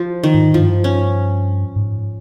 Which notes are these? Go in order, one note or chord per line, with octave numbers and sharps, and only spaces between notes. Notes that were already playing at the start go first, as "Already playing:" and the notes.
Already playing: F3
D#3
G#2
G2 F3
C#4
G#2